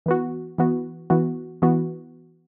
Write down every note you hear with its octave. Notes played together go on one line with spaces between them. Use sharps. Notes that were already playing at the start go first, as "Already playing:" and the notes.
E3 B3 F#4
E3 B3 F#4
E3 B3 F#4
E3 B3 F#4